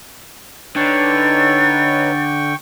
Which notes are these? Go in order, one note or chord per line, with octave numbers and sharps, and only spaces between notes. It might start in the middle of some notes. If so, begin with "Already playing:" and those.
D3 D#4 B4 C#5 G5 C#6 A6